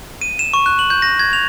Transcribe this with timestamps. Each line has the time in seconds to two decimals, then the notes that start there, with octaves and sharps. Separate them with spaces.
0.21 D#7
0.39 E7
0.54 C#6
0.66 F#6
0.79 F#7
0.90 G6
1.02 A#6
1.19 G#6
1.33 F7